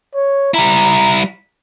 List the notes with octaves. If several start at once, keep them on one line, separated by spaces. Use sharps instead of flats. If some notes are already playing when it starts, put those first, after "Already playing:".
C#5
G3 E4 A#5